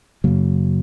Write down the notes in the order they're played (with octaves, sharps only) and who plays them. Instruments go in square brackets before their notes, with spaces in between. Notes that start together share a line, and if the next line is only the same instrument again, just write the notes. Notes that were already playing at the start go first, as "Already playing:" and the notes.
[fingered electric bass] F#2 C#3 F#3 A#3